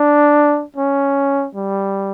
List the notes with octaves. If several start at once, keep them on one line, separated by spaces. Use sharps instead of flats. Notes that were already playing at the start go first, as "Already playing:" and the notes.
Already playing: D4
C#4
G3